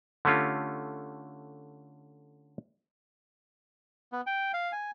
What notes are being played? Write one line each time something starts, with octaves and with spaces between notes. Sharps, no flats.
D3 A3 C#4 F4 G4
B3
G5
F5
G#5